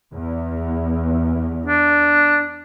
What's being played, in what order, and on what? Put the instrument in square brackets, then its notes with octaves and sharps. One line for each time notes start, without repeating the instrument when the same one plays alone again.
[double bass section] E2
[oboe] D4